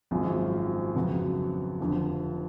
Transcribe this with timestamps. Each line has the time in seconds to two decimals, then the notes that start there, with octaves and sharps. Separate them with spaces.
0.11 G#1 F#2 F3 G#3
0.95 F2 C#3 F#3 B3 F#4
1.80 F1 F2 D3 F3